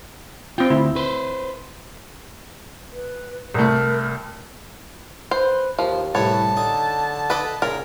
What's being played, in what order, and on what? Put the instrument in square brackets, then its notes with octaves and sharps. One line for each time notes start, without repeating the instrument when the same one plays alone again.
[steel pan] C4 G5 [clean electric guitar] F4
[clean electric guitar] D2 [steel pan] E4
[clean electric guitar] B4 C5
[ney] B4
[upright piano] C2 A3 [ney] A#4
[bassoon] B4 [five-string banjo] C5
[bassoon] D#2 [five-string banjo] F3
[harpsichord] C2 A2 G3 [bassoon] B4 [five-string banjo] C#5 [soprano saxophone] A5
[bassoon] D3 [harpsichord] D#4
[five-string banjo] A4 B4 [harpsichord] D5 D#5
[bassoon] A#2 [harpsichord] C#3 [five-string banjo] A#4